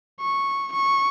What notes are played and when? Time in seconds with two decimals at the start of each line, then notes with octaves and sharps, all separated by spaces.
0.20 C#6
0.72 C#6